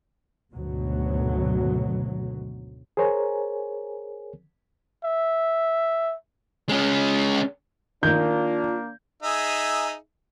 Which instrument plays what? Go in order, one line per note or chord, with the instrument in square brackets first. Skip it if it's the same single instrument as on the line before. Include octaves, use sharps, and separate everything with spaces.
[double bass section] G#1 D2 B2 F#3
[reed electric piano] G#4 A#4 C5 C#5 G#5 A#5
[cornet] E5
[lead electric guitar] G#3 C#4
[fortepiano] D#3 [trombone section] A#3 D4 [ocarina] F4 [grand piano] G6
[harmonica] D#4 G#4 E5